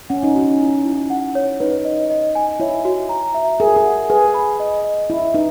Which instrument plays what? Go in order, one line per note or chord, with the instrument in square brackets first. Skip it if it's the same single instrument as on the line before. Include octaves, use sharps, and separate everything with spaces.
[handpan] C#4 [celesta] F#5
[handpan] D#4
[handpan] C#4 [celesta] F#4
[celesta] E4
E4
F#5
C#5
[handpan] D#4 [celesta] B4
[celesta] D#5
D#5
G#5
[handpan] E4 [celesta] C#5
[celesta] F#4
A#5
E5
[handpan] G#4 [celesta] A#4
[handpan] G#4
[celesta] F#5
[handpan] G#4 [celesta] B4
[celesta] B5
D#5
D#5
[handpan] E4 [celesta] E5
[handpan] D#4 [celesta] B4